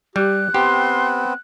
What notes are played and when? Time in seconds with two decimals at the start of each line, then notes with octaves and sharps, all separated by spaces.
0.16 G3 G4 F#6
0.54 B3 C4 G4 C6